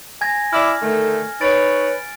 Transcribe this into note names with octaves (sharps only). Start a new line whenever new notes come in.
G#5 G#6 A#6
E4 D5 F6
D3 D#3 A3
D#4 B4 C#5 A6 D7